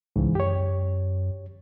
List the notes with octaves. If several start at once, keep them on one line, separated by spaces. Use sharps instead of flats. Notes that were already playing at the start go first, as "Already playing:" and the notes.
C2 G#2 C#3 E3
F#2 G4 C#5